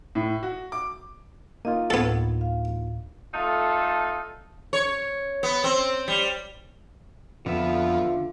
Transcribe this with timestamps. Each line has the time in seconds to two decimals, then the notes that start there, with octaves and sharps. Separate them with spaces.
0.15 A2
0.43 F#4
0.72 D6
1.65 A#3 D#4 F4 D#5 F5
1.90 D2 A2 B3 A4 G#6
2.41 F5
3.34 A3 D#4 F4 A4
4.73 C#5
5.43 B3
5.64 C4
6.08 G3
7.46 F2 D3 B3 F4 E5